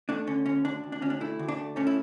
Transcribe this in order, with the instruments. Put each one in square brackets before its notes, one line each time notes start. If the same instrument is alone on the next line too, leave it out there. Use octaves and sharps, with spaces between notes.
[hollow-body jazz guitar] A3 D4
D3 C#4
D2 C#4
D2 D4
D2
D4
D2 C#4
D4
A3 E4
D2
D4
A3
A3 C#4
E4